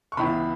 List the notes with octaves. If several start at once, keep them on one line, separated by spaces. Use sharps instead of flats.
C#6
C#2 C#3 E3 B3 E4 B5